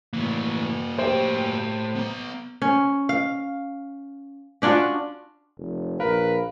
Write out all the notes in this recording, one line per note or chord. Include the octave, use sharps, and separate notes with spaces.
A2 E3 A#3 F#4
A2 G4 C5 G5
B3 A#5
C#4
F5
C#4 D4 F4 F#4
F1
A#1 A#4 B4 F5